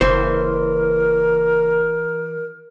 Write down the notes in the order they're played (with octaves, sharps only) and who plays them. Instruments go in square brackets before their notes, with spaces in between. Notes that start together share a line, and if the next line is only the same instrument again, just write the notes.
[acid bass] F#1 [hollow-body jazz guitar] E3 C5 [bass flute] A#4